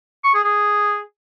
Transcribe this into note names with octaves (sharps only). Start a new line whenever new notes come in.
C#6
G#4
G#4